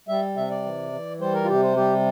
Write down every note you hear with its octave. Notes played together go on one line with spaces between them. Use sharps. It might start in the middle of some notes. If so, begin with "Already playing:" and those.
G3 E5
C3 E5
D5
E3
E3
G3 C5
A#4
F4
C3 G4
C5
G3 G4